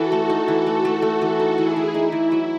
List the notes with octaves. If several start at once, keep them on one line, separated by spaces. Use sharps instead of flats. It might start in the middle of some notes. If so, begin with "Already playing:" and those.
Already playing: E3 F#4 A4
A3
D#4
E3
A3
A3
A3
E3
D#4
E3 E4 G#4
E3
D#4 E4
E3
F#3